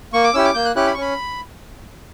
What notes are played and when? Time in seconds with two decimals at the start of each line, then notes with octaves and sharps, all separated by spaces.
0.13 A#3 C#6
0.24 D6
0.34 C#4 E4 G4 E6
0.45 D6
0.54 A#3 G6
0.65 F#6
0.76 C#4 E4 G4 F#6
0.87 B5
0.94 C#6
0.97 C#4 B5